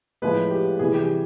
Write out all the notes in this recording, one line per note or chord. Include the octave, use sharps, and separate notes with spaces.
A2 F3 G#3 B4
G4
C3 E3 G3 G#4
G4